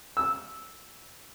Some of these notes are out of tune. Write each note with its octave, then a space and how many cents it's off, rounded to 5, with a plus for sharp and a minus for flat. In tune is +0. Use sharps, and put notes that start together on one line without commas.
E6 -10